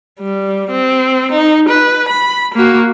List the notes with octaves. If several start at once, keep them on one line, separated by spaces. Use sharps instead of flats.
G3
C4
D#4
B4
B5
A#3 F#4